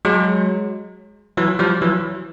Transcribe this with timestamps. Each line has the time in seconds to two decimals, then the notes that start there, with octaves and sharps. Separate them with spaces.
0.05 F#3 G#3
1.37 E3 F#3
1.59 F3 G3
1.81 E3 F#3